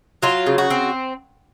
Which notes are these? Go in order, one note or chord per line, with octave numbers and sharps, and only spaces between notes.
F#3 F4
C#3
F#4
C4